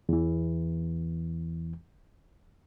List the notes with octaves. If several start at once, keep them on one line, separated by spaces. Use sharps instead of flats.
E2 E3